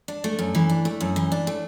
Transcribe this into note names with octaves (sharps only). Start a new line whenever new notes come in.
D4
A3
F#2
E3
D4
A3
F#2
E3
D4
A3